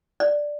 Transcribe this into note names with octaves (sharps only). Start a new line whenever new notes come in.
D5